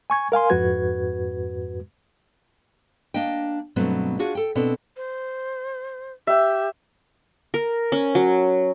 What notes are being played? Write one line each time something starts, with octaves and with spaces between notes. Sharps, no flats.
G#5 C#6 G#6
A#4 F5 G#5 C6
F2 G#2 F#4 B4 G#6
A#3 D4 D#5 G5
G2 B2 F#3 A3 B3 C4
D4 F4 F#4 G#4
A4 G5
B2 C4 D4 A4
C5
G4 E5
A#4
C#4
F#3